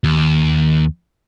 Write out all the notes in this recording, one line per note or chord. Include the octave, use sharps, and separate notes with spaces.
D#2